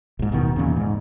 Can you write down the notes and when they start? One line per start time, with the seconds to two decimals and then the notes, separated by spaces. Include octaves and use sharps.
0.19 A#1 G#2
0.32 D#1 B2 D#3
0.56 E2 A#2 C#3
0.77 G#2